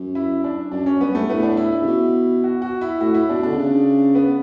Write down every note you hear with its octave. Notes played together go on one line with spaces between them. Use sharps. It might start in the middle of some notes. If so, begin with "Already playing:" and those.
Already playing: F#2
E4
D4
F#2 D4
C#4
G2 B3
A3
A2 B3
D4
E4
E4
C#3
B2
F#4
F#4
E4
A2 F#4
E4
B2 D4
D3 D4
C#3
B3